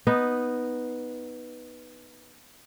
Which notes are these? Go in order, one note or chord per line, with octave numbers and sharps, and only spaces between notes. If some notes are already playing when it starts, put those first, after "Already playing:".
B3 D#4